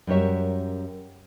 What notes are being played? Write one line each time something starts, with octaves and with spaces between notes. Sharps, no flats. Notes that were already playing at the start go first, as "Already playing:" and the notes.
F#2 G3 A#4 C#5 E5